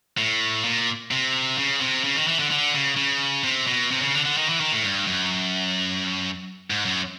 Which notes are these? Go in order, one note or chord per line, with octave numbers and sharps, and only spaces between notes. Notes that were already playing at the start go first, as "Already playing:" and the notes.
A2
A#2
C3
C#3
C3
C#3
D#3
E3
D3
D3
C#3
C#3
C3
B2
C3
C#3
D3
D3
D#3
E3
D#3
A2
G2
F#2
G#2
F#2